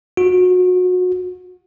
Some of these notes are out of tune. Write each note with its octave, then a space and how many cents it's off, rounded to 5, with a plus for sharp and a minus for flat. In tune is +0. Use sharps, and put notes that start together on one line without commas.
F#4 -30